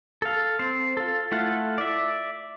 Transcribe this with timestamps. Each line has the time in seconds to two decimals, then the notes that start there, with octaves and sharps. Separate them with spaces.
0.22 A4 F5
0.59 C4 C5
0.97 F4 A4
1.32 A3 E4 F4 A4 F#5
1.78 D5 E5